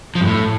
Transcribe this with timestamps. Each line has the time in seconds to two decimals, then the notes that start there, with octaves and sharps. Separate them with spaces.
0.15 F3
0.21 G2
0.26 A2